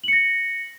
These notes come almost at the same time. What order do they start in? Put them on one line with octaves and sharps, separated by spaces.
F#7 C#7 A#6